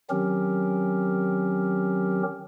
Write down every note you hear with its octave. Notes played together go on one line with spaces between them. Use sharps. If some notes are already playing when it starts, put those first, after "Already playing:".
D#3 F#3 C4 C#4 G4 A#4